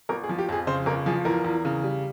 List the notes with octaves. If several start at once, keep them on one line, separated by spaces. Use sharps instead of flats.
G1 A#4
G#4
F3
G4
F2 G#4
C#3 C5
G1 A#4
F3 G#4
E2 A#4
E2
C#3
G3